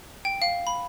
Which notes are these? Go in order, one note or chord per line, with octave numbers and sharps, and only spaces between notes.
G5
F5
B5